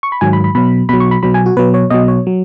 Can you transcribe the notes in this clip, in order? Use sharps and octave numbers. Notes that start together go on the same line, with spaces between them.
C#6
B5
G#2 D#3 F#3 G#5
B5
B5
B2 F#3 B5
B2 F#3 B5
C#6
B5
B2 F#3 B5
G#5
F#4
B2 F#3 B4
C#5
B2 F#3 D#5
C#5
F#3